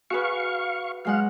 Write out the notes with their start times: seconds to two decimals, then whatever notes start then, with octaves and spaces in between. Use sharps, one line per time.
0.10 F#4 G#4 B4 F5 C#6
1.05 F#3 G#3 F5 F#5